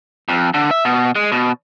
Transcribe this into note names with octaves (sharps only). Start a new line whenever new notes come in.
F2
D3
E5
B2
G#3
B2